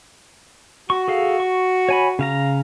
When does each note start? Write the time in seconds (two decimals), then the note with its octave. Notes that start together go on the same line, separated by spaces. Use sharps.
0.90 F#4 C#6
1.08 G#4 A4 F5
1.40 C#6
1.89 C#5 G#5 B5
2.19 C#3 F5 A#5